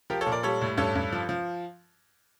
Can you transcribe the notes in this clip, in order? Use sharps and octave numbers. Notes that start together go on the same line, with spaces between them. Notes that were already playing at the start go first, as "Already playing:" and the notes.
F3 G4 A#4
A4 C#5
A#2
A#4 D5
G3 A4 C#5
A2
G2 A4 C#5
G2
F3
F3